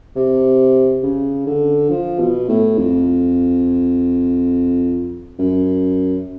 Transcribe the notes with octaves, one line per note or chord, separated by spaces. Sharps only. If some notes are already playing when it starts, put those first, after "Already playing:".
C3
C#3
D3
F3
B2
A2
F2
F#2